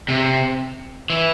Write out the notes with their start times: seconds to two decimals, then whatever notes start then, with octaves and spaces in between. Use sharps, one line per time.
0.08 C3
1.10 E3